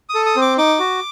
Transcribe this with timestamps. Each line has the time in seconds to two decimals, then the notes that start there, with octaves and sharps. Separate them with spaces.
0.09 D#6
0.15 A4
0.26 D#6
0.36 C4
0.42 D6
0.58 D#4 D6
0.79 F#4